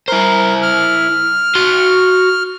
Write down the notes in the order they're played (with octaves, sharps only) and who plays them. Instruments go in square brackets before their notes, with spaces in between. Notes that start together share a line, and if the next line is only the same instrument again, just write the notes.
[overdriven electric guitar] E4 C5 [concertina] A#4
[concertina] F6
[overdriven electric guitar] F#4 C6